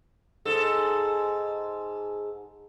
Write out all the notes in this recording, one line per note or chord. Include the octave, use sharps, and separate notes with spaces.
G#2 A4